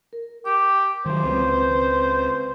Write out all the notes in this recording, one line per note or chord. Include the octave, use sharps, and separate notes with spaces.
A#4
G4 D6
D#3 F#3 C5
C#2 C4 B4